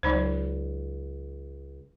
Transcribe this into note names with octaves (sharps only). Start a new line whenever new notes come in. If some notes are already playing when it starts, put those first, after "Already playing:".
C#2 F#3 D#4 C5